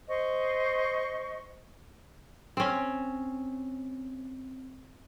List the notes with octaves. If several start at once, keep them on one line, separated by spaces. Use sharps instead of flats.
C5 D#5 C#6
C4 C#4